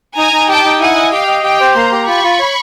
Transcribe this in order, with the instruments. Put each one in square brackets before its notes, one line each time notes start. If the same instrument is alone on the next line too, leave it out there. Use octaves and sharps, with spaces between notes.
[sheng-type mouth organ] D#4 [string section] G#5 A#5
[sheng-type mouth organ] D#4
[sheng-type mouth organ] G4 [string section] G5 A5
[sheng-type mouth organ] D#4
[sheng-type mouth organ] E4 [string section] F#5 G#5
[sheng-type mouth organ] D#5
[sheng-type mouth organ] G4 [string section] F5 G5
[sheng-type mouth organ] D#5
[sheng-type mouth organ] G4 [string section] F5 G5
[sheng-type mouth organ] C5
[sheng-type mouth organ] A#3 [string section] A#5 C6
[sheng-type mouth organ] G4
[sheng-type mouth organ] F4 [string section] B5 C#6
[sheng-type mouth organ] F4
C#5